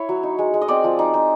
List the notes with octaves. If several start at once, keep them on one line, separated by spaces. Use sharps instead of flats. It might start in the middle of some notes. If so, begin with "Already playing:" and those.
Already playing: E4 C#5
F#3
D#4
G#3
G#3
D#5
C4 D5
F3
D#4
D#4